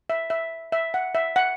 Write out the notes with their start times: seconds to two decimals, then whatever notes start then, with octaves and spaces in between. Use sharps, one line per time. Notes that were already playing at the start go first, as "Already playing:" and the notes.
0.10 E5
0.30 E5
0.72 E5
0.94 F#5
1.15 E5
1.36 F#5